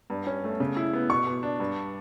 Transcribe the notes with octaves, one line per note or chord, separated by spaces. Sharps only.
G2
C#4
A3
C#3
E4
B3
B2 C#6
B2
D4
G2